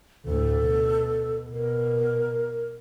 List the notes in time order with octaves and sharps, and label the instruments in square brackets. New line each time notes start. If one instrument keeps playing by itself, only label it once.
[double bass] D2 A2 [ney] A4
[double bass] B2
[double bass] B2 [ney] A#4